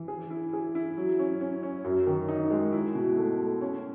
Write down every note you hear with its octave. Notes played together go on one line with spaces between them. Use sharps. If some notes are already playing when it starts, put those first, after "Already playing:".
Already playing: E3
G#4
E4
G#4
E4
F#3
C#4
C#4
C#4
F#2
D#3
D#4
G#3
E4
B2
A3
A3
C#4